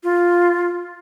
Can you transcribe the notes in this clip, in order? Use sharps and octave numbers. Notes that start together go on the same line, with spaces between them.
F4